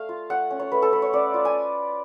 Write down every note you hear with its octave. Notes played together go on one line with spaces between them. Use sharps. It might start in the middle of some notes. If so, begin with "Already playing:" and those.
Already playing: A3 F5
F4
A3 F#5
C#4
C#5
A3 B4
A4
A3 B4
C#5
C#4 D5
F4
G#5